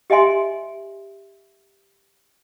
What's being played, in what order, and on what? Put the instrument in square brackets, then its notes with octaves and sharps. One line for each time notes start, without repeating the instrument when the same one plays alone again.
[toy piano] G4 D#5 E5 G#5 C6